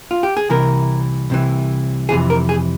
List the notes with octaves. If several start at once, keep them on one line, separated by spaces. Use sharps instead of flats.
F4
G4
G#4
C2 C3 E3 A#4
C2 C3 E3
F2 C3 E3 G#4
A#4
G#4